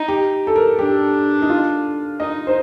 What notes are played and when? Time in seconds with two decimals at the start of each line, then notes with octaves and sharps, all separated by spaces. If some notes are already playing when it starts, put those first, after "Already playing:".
Already playing: D#4
0.08 G4
0.47 A4
0.56 A#4
0.78 D4 G4
1.42 D#4
1.50 F4
2.20 D#4 D#5
2.47 C5